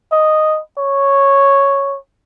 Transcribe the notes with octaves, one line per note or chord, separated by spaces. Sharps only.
D#5
C#5